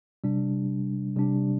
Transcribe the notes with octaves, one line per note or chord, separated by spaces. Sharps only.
C3 G3 D4
C3 G3 D4